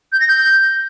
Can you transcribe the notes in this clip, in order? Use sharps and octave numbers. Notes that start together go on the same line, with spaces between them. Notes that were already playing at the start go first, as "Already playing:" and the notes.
G6
A#6
G6